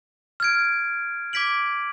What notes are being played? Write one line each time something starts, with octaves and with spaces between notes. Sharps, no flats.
F6 G#6 D7
D6 G#6 B6 D7 F#7